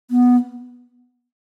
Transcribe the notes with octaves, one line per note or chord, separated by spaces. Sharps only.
B3